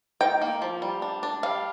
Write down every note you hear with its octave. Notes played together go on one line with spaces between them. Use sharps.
D#4 G5
A#3
F3
G3
D4
D4
G3 F5